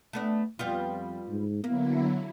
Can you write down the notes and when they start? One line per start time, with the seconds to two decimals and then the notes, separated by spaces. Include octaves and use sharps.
0.13 A3 B3 D4
0.59 F2 G3 B3 F4
1.28 G#2
1.64 D3 F#3 A#3 B3 E4